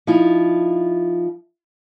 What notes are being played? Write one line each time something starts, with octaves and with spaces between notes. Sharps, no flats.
F3 D#4 E4